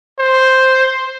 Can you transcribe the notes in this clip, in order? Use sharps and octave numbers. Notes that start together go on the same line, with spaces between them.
C5